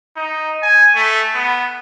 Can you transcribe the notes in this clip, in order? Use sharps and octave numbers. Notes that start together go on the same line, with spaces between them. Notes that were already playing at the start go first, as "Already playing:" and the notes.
D#4
G#5
A3
B3